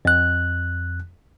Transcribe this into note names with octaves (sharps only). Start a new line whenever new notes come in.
F2 F#6